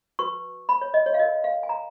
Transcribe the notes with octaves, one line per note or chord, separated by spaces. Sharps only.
F#4 B4 C#6
B5
C#5
D#5
C#5
F5
F#4 A#4 C#5 D#5
F5
G#5
A#5